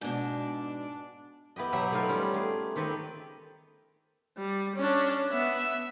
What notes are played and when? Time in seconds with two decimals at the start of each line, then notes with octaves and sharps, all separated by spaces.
0.01 G#2 B2 D4
1.56 B3 E4 G4 D#5
1.72 B2 F#3 G4 E5 F#5
1.92 A3 B3 D#4 F4 A#4
2.09 G3 B3 C#4
2.34 A3 G#4
2.76 D#3 C4 G4 A4 B4 D#5
4.37 G3
4.76 C#4 D4
5.30 B3 E5